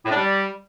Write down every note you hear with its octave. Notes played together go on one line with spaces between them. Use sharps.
A2
D4
G3